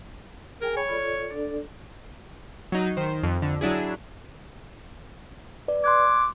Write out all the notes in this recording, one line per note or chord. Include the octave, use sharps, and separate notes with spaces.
G#4 A#4 G5 G#5
C#5 B5
F4 A4 D5
D4 A4 D5
F#3 D#4
D#3 C5
F2
F2 D3
F#3 D4 E4 G#4
B4 D5
C6 D6 F#6 G#6